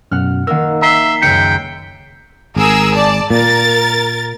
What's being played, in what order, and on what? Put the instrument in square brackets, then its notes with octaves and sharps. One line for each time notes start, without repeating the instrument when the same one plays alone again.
[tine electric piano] F#2 B2 [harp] F#5 F6
[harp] D#3 A#3 A#4 [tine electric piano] F#5 E6
[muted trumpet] E5 [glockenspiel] A#5 C7 G7
[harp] C#2 F#2 [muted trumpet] G5 [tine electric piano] B6 C#7
[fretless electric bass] G#1 [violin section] G#4 A#4 E6
[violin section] D5 A5
[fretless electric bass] A#2 [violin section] A#4 A6